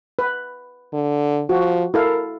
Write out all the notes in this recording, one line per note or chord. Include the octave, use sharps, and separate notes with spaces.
B4
D3
F3 F#4
E4 A4 A#4 F5